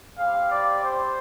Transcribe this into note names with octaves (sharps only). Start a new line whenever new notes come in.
G3 C4 G4 F5
D5
C5